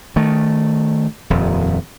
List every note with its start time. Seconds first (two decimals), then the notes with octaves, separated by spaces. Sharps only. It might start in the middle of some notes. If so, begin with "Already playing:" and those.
0.16 D#3 A3
1.30 D#1 F2